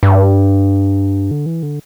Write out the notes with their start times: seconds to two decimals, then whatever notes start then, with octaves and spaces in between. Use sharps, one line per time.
0.03 G2
1.31 D3
1.46 E3
1.63 D3